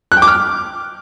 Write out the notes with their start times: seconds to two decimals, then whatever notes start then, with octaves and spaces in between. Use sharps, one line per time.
0.12 F#6
0.17 G5
0.22 D6
0.27 F6